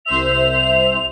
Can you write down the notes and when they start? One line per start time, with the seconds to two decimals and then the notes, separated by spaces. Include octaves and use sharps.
0.06 C2 C5 E5 F7